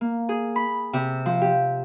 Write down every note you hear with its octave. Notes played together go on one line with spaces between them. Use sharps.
A#3
G#4
B5
C3
F3
G4